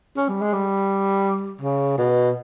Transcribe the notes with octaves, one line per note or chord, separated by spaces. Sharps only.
C#4
G3
G#3
G3
C#3
B2